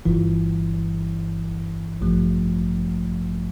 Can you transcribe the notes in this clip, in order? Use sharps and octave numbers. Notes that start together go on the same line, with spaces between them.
G1 G2 E3
A1 G2 F3 A3